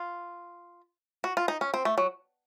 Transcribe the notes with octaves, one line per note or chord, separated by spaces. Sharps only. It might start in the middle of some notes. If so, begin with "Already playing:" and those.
Already playing: F4
F#4
F4
D#4
C#4
C4
A3
F#3